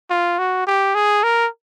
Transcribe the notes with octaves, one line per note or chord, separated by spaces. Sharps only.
F4
F#4
G4
G#4
A#4